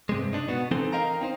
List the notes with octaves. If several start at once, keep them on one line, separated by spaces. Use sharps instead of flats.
G2 C3 G#3
D4 D#4
B2 B3 F#4
E3 C4 D#4 A4 C6
A#4 D#5 F5 G5 A#5
C4 D#4 C5